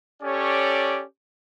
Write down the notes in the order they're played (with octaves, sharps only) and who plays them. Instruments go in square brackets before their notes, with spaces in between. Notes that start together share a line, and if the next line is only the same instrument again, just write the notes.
[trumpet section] C#4 G4 A4 C#5 D5